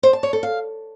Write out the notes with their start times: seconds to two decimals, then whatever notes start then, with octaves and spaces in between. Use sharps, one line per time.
0.03 C5
0.13 A5
0.23 C#5
0.33 A4
0.43 F5